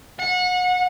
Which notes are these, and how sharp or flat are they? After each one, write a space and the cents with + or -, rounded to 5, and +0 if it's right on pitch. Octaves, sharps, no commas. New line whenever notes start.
F#5 -30